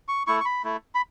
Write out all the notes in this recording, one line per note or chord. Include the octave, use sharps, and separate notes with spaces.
C#6
A3 E4 C#6
C#6
B5
A3 E4
B5